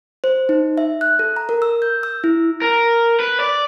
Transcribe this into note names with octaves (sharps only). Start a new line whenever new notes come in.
C5
D#4
E5
F#6
A4
A#5
A#4
E6
G6
E6
E4
A#4
B4
D5